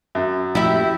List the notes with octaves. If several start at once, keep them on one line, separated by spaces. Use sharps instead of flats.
F#2
A#2 F3 A3 E4 G4 E5